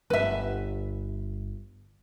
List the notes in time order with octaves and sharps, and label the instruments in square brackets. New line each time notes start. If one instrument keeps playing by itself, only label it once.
[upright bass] G1 [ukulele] B4 E5